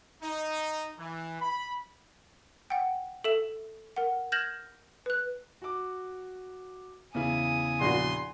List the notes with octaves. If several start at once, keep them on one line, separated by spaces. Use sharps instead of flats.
D#4
E3
B5
F#5 G5
A4 E5 E7 F#7
A#4 F#5
F6 G6 G#6 A#6 E7 F#7
B4 F#6
F#4 D6
E2 C#3 E4 G#5 D#6
A#1 F#4 C6